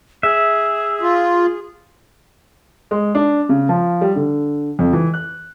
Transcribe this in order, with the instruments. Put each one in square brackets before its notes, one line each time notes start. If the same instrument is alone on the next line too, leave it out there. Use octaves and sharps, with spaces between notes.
[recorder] G#4 [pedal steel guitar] E5
[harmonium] F4
[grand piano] G#3
D4
C#3
F3
G3
D3
F2
E3
F#6